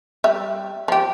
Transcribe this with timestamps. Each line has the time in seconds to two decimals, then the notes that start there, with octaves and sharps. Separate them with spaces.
0.24 G3 E5
0.88 F3 G4